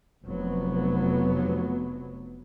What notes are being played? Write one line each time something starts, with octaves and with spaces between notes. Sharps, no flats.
F1 F#3 B3